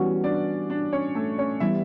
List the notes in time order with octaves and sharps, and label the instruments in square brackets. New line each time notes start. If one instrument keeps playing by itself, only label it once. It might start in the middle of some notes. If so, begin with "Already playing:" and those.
Already playing: [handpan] E3 G3 B3 F#4 [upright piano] C#4
[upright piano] D4 D5
D4 D5
C#4 C#5
A3 A4
C#4 C#5
[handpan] E3 G3 B3 [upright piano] E4 E5